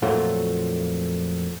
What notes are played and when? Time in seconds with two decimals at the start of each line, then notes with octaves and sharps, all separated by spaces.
0.02 F2 A#2 F#3 A3 F4